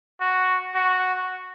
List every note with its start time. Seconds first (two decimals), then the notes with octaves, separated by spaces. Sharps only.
0.21 F#4
0.75 F#4